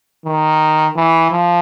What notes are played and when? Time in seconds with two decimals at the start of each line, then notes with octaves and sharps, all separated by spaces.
0.25 D#3
0.96 E3
1.31 F3